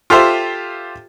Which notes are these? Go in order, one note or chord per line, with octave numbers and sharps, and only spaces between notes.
F4 G4 A4 C5 E5